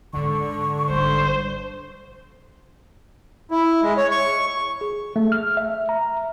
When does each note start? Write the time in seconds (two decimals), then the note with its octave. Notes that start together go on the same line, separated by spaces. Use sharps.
0.13 G#2 D3 D#3 C#6
0.90 G#1 G3 C5
3.51 E4
3.83 G#3
3.97 C#5
4.11 C#6
4.81 G#4
5.16 A3
5.32 F6
5.57 E5
5.89 A#5